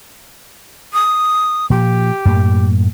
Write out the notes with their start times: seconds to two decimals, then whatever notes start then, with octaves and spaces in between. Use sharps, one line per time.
0.93 D#6
1.70 A#2 F3 G4
2.25 F#2 A2 A#3